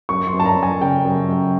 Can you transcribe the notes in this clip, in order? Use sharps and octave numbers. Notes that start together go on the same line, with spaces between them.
F#2 C#6
C6
F#2
A5
A#5
F#2
G#5
C#3 G5
F#2
F#2